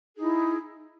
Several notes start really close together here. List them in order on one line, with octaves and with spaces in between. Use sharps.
G#4 D#4 E4